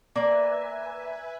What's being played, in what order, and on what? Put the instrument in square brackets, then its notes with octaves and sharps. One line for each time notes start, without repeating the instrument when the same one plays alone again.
[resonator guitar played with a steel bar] A#3 D5 [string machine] B4 E5 G#5